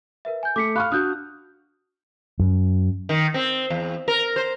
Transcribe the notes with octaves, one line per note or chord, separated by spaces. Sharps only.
A#4 B4 E5
G#5 G6
A3 D6 B6 C#7
F5 B5 C#6 F6 F#6
D4 F#4 D#6 F#6 G6
F#2
D#3
C4
E2
A#4
C5